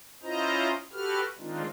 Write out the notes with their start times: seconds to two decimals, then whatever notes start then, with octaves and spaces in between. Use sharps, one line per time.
0.23 C#4 E4 F4 C5 D#5 A#5
0.93 F#4 G4 A4 B4 F6
1.39 D#3 G#3 C4 D4 D#4 F4